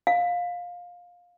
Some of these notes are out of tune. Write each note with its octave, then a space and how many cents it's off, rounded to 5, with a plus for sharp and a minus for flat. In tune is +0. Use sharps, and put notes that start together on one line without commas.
F5 +15